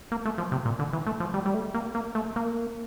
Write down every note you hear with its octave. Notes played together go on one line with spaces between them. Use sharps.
A#3
A3
F3
C3
A#2
D3
E3
A3
F3
G3
G3
A3
A#3
A#3
A3
A#3